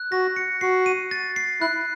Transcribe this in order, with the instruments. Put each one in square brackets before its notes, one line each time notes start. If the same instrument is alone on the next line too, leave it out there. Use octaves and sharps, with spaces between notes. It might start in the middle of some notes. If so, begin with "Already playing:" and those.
Already playing: [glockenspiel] F#6
[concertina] F#4 [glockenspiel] A#6
[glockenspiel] C#7
[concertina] F#4 [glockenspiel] C7
[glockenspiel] D#7
A6
C7
[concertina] E4 [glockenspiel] F#6